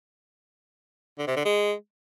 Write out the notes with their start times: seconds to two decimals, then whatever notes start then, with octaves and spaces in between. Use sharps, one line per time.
1.19 D3
1.27 C3
1.36 D3
1.45 G#3